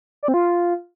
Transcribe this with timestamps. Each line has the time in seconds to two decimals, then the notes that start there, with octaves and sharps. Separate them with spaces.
0.23 D5
0.28 C4
0.34 F4